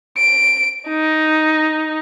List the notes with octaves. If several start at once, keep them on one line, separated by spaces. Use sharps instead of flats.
D7
D#4